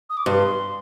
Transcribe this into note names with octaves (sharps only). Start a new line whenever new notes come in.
D#6
D6
G2 C6